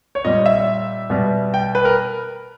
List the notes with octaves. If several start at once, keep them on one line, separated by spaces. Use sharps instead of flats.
C#5
A#2 G3 D#5
E5
B2 G3
G5
B4
A#4